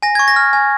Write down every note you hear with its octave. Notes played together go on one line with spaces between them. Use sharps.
G#5 A#6
C#6 G#6
A#6
F6
G#5